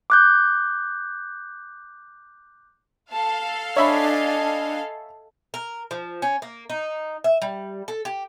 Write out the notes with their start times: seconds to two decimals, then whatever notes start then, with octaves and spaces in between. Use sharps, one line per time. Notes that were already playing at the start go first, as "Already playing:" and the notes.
0.10 D6 F#6 G6
3.12 A4 F5 A5
3.77 D4 C#5 D#5 E5 G#5 B5
5.54 A#4
5.91 F3
6.22 C#4
6.42 A#3
6.70 D#4
7.24 E5
7.42 G3
7.88 A4
8.05 G4